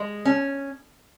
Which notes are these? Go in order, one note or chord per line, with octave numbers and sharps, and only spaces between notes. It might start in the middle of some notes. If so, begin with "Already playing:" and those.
Already playing: G#3
C#4